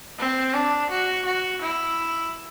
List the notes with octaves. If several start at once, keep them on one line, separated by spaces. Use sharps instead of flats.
C4
D4
F#4
F#4
E4